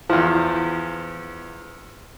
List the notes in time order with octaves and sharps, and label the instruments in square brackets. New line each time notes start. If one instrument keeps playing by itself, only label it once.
[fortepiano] E2 F3